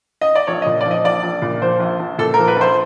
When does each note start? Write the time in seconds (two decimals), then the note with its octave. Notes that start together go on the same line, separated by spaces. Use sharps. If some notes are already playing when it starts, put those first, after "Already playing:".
0.21 D#5
0.35 D5
0.47 A#1 C#5
0.62 A#2 D#5
0.81 D5
0.86 F3 D#5
1.05 A#1 D5
1.23 A#1
1.42 A#2
1.62 F3 C5
1.80 A#1
1.99 A#1
2.18 A#2 A4
2.34 F3 A#4
2.48 B4
2.57 A#1 C5